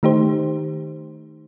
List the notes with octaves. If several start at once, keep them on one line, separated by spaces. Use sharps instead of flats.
D#3 A3 D#4 G4 C5